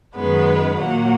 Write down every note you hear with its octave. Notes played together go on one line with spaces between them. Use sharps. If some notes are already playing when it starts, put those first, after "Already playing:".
F#2 D#3 G#3 B3 B4
A#2 F#3 A#3 F#5